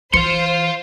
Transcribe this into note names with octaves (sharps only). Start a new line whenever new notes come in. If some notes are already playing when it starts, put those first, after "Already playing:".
E3 C5 F5 C6 C#7